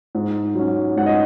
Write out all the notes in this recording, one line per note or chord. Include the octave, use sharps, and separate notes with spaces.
G#2
F#3 C#4
G#2 F#5
D#5